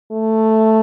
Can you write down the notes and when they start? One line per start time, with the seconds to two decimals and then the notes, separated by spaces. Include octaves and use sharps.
0.12 A3